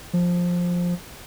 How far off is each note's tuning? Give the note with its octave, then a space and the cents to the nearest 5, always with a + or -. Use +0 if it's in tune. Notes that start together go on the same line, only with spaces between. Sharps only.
F3 +10